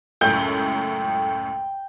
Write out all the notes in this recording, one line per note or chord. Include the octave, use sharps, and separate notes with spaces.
C#2 F#2 A2 G5